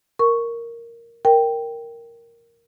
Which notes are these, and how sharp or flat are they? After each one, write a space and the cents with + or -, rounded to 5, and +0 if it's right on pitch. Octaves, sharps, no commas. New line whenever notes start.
A#4 +0 C#6 +0
A#4 +0 G5 +0